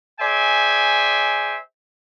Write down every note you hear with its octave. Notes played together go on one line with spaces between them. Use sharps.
G#4 C5 D5 E5 G5 G#5